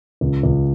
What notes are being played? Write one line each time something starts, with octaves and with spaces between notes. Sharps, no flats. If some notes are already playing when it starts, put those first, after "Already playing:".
C#2
C#2